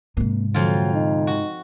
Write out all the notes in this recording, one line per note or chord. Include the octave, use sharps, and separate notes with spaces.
G#2 C3 A#3
F2 D3 F#3 F4
D#4
F#4